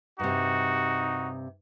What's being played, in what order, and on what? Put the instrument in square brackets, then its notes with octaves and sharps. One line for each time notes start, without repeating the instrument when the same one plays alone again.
[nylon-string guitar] G2 C3 [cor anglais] D#4 [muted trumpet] F#4